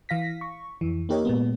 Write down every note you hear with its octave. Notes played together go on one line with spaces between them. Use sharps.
E3 F5 A#6 B6
C#6
F2 E3
A#3 D#4 G4 A#4 C#5 D#5
A#2 G#3 B3